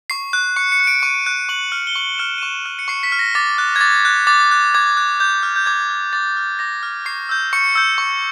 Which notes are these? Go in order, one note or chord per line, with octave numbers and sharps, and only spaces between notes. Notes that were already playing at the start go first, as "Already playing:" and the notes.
C#6 C7
F#6
C#6 C#7
C#7
F#6
D7
C#6 D#7
F#6
C#6 F#7
F6
G7
C#6 F#7
F6 E7
D#7
C#6 E7
F6
C#7
C#6 C7
B6
F6
A#6
D6 A6
F#6
G#6
D6 A6
F#6
D6 A6
F#6
D6 G#6
F#6
D6 G6
F6
G6
D6 G#6
F6
D6 A6
F6
D6 A#6
F6
C#6 C7
E6 G6
C#6 C#7
E6 G6
C#6